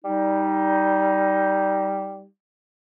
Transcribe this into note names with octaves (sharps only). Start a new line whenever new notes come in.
G3 D#4